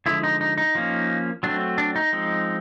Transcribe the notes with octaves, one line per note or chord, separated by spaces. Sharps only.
D3 F3 G#3 E4
D#4
D#4
D#4
F3 A#3 C#4
F#3 A3 C4 D4
D4
D#4
F3 G#3 C4